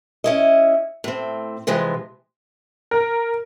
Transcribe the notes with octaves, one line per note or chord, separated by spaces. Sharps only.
C#4 E4 D#5
A2 C4
C3 E3 F3 G#3
A#4